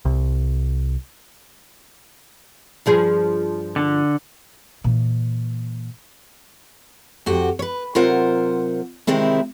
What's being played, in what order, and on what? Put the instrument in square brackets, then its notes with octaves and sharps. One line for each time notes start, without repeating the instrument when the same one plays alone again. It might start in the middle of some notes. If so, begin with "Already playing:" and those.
[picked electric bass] C2
[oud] G2 F3 G#4
[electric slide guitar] D3
[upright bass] A#2 E3
[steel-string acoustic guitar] F2 F#4 G4
B4 C#5
C3 F#3 F4 A#4 C5 F#5
C3 D#3 G#3 C4 E4